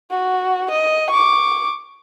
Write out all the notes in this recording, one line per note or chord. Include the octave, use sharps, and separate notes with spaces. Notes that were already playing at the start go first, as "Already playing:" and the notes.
F#4
D#5
C#6 D6